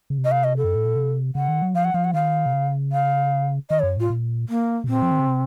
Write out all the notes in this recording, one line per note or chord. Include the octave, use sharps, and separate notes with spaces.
C#3
C3
D#5
F5
D#5
A4
F#2
A2
A#2
C3
C#3 F#5
D#3
F#3
F3 F5
F#5
F3 F5
F#5
D#3 F5
C3
C#3
F5
D#3 D#5
C#5
F#2
A2 F4
A#2
A#3
C3
A#2 C4
F3
D#3
C#3
C3